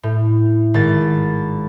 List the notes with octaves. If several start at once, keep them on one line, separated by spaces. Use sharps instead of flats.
A2
G#1 A6